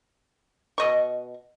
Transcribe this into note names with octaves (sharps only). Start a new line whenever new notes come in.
B2 D#5 C#6